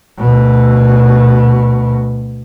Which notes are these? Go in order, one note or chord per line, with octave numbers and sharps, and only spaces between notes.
D2 B2